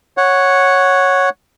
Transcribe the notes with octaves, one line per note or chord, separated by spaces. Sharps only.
C#5 F#5